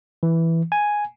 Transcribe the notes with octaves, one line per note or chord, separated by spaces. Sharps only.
E3
G#5